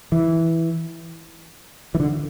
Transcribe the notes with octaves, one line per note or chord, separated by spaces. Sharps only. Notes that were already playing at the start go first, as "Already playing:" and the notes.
E3
E3
D3